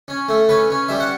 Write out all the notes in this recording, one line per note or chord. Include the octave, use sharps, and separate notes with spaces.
C#4
A3
C#4 B4
C#4
G3 E5
F#5